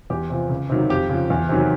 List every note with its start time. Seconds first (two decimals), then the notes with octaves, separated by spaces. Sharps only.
0.10 E2 G4
0.30 C3 F3
0.50 C#2
0.69 C3 D#3 F#3
0.90 F2 G4
1.09 C#3 F3
1.30 E2
1.49 C3 D#3 F#3